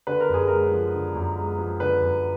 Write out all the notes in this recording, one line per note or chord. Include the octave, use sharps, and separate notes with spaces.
D3 B4
A#4
F#2 G#4
G#3 A#4
F3
D3
F#2
G#3
F3
D3 B4
F#2